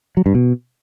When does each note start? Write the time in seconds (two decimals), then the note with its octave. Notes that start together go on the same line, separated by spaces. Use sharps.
0.17 F#3
0.26 G2
0.35 B2